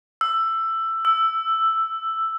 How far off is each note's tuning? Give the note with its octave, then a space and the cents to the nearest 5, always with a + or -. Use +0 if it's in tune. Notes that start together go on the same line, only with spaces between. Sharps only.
E6 +15
E6 +5